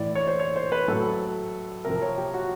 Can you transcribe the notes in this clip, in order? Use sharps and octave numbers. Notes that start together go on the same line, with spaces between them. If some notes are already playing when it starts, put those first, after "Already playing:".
Already playing: A2 E3 D5
C#5
C5
C#5
C5
B4
A2 F#3 A4
C3 F3 A#4
C#5
G4
F#4